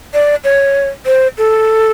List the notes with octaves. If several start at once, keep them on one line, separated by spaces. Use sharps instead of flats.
D5
C#5
C5
A4